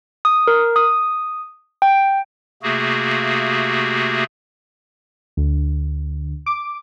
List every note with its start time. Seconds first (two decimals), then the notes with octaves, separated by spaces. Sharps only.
0.25 D#6
0.47 A#4
0.76 D#6
1.82 G5
2.63 C3 A3 A#3 F#4 G#4
5.37 D2
6.46 D6